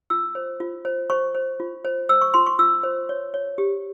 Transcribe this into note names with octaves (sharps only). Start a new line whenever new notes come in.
F4 E6
C5
F4
C5
C5 C#6
C5
F4
C5
C5 E6
C#6
F4 C6
C#6
F4 E6
C5
C#5
C#5
G4